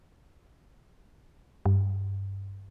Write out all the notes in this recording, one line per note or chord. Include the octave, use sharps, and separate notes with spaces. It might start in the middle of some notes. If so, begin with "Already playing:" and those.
G2